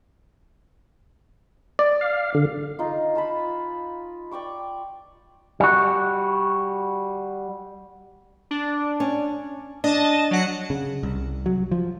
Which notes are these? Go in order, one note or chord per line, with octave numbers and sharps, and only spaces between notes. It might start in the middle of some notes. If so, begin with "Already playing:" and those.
D5
F5
D3
D#4 F4
F4 A5 B5
D5 G5 C#6 D6
G3 F#4
D4
C#4
D4 D#5 A5
F#3 F#5 C#7
C#3
C2
F#3
F3